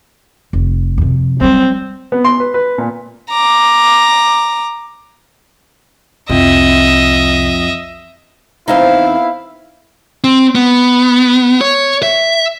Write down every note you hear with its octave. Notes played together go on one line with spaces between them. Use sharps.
F1
F2 C3
F#3 G3 C4
B3
C6
B4
B4
A#2
A#5 D6
C2 F2 D#5 E5
E2 B3 C4 D#4 E4 F5
C4
B3
C#5
E5